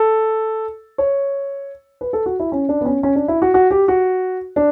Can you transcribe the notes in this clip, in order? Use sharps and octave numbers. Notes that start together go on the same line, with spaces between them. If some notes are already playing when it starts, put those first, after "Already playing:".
Already playing: A4
C#5
B4
A4
F#4
E4
C#4
D4
B3
C#4
C#4
D4
E4
F#4
F#4
G4
F#4
D4